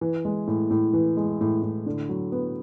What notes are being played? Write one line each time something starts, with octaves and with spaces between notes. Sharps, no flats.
E3
G#3
A2
A2
E3
G#3
A2
A2
D3
F#3
B3